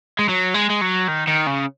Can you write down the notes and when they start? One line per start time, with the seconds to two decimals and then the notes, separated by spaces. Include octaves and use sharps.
0.19 G#3
0.29 F#3
0.54 G#3
0.70 G#3
0.82 F#3
1.08 D#3
1.27 D#3
1.47 C#3